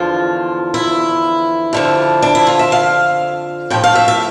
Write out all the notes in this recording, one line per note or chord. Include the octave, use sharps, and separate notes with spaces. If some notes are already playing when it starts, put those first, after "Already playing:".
Already playing: E2 D3 F3 F4
E4
F2 D3 F3
D4
E4
F4
E5
F5
A2 F3 G5
F5
E5
E5